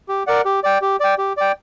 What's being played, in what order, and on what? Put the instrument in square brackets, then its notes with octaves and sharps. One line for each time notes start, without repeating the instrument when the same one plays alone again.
[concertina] G4
A#4 D5 F#5
G4
D5 G5
G4
D5 G5
G4
D5 G5